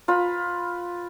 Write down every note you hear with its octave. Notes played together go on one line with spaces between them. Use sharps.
F4 B4 B5